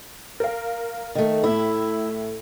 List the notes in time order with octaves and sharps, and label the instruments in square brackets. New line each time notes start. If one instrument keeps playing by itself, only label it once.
[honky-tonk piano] A#4 F5
[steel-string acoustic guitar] D#3 A3
[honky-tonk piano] A2 E5 [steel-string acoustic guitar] E4 [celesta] A4